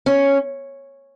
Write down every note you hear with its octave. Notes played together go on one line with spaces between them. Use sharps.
C#4